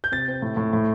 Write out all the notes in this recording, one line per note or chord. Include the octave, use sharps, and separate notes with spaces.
G6
C3 A6
C4
A2
A2
A2